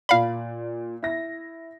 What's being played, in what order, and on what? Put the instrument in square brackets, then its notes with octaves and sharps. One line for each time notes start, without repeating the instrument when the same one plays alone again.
[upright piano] A#2 D5 [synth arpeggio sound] F5 B5
[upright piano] E4 A#6